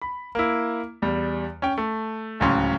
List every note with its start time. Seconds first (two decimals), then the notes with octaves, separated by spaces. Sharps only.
0.02 B5
0.35 A#3 E4
1.02 E2 G3
1.62 C#4 G5
1.78 A3
2.40 D1 C#2 F#3 C#4 C6